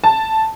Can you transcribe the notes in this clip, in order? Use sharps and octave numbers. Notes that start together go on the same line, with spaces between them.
A5